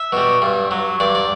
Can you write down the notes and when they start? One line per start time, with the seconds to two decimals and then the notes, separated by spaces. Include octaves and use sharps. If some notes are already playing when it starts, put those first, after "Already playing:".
Already playing: E5
0.12 B2 G3
0.42 G2
0.71 F#3
1.00 G2 D5
1.15 D5